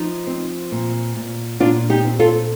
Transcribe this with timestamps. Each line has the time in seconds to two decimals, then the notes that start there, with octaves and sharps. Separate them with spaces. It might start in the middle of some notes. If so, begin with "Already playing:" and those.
Already playing: F3 D#4
0.27 C4
0.72 A#2
1.17 A#2
1.60 A#2 D4 F4
1.90 D#4 G4
2.05 C4
2.20 F4 A4